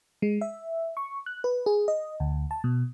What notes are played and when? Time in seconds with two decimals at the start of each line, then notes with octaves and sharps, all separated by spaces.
0.22 G#3
0.41 E5
0.97 C#6
1.26 F#6
1.44 B4
1.66 G#4
1.88 D#5
2.20 D2
2.51 A5
2.64 B2